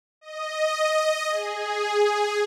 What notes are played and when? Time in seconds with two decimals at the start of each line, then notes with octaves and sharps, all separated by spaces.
0.21 D#5
1.29 G#4